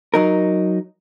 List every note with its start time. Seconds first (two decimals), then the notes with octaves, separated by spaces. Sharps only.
0.14 F#3 D#4 A#4